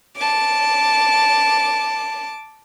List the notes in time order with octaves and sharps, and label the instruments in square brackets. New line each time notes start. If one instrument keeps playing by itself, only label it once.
[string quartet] A5 D6